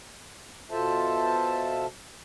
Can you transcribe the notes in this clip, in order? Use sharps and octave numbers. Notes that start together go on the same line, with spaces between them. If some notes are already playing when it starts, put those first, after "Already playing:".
B2 F4 A4 C5 E5 A5